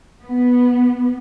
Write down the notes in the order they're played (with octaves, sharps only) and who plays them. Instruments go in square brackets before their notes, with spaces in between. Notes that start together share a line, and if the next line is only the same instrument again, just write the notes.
[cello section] B3